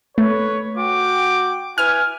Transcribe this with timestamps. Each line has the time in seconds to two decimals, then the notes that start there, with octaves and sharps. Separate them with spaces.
0.18 A3 B4 C#5
0.78 F#4 G5 D6
1.78 E4 B4 G#5 F6